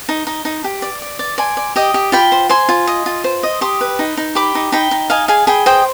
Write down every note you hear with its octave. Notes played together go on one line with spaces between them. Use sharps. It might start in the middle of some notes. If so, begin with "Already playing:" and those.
D#4
D#4
D#4
G4
D5
D5
D5
D5 G#5 C6
D5
G4 D#5 G5
G4
F4 G5 B5
C5
C5 G#5 C6
F4
D#5
F4
C5
D#5
G4 C6 D#6
B4
D#4
D#4
G4 B5 D6
D#4
D#4 G5 B5
D#4
D#5 F5 G#5
G#4 F5 G#5
G#4 G5 B5
C5 D#5 G5